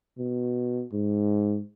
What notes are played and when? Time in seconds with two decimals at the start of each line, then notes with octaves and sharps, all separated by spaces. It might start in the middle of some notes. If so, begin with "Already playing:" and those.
0.18 B2
0.93 G#2